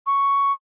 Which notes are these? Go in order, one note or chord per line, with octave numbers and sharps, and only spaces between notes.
C#6